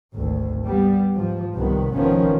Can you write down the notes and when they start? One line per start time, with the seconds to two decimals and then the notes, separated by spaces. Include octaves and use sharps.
0.15 G#1 D2
0.66 G3 B3
1.13 G#2 F3
1.55 C2 C3 D#3 B3
1.94 F1 B2 D#3 F3 B3 C#4